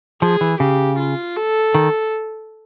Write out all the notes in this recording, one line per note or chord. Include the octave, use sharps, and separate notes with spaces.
F3 G#4
E3
C#3 G4
F4
A4
D#3